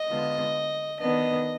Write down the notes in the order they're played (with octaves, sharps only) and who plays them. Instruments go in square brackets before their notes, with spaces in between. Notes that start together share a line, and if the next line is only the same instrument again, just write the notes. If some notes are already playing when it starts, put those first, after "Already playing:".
Already playing: [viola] D#5
[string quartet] D3 G#3 B3 F4
[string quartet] D#3 B3 D4 [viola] D#5